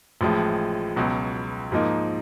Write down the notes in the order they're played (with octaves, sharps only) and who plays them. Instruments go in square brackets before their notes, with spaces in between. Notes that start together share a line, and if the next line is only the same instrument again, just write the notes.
[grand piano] A1 A2 F3 G#3
C#2 B2 F#3
G#2 F3 A#3 D#4